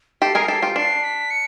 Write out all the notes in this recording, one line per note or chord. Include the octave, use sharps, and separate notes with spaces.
G4 A4 C7
G#4 A#4
G4 A4
F4 G4
D4 C7
B6
C#7